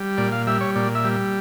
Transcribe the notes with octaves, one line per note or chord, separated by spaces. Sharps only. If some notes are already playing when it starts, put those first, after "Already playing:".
Already playing: G3
A#2 D5
F5
G3 E5
C#5
A#2 D5
E5
G3